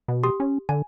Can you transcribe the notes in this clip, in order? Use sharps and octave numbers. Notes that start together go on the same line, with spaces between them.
B2
G4 C6 D#6
C#4
D3 G#5